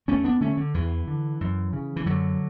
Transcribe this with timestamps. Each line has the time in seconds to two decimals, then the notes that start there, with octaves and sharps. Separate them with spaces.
0.08 E2 A3 C#4
0.24 B3 D4
0.41 D3 A3 C#4
0.57 D3
0.74 E2 E3
1.08 D3
1.41 F#2
1.73 C#3
1.96 E3
2.06 F#2 D3 F#3